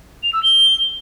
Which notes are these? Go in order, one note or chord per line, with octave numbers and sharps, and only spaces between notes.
F7
E6
G7